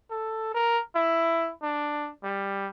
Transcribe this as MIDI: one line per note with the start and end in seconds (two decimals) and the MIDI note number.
0.11 0.51 69
0.54 0.81 70
0.95 1.51 64
1.62 2.11 62
2.24 2.69 55